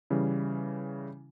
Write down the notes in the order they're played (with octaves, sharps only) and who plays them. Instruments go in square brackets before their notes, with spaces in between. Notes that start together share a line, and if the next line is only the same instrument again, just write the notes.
[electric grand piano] C#3 E3 G3